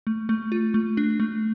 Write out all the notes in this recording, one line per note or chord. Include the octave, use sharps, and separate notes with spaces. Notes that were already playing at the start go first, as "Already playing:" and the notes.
A3
A3
F4
A3
D4
A3